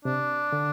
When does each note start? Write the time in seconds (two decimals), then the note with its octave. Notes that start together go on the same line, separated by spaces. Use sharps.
0.05 C3 D4
0.52 D3